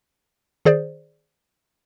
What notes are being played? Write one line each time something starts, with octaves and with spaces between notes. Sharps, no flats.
D#3 G#4 C5 D5